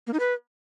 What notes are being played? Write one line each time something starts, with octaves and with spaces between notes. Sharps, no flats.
A#3
D#4
B4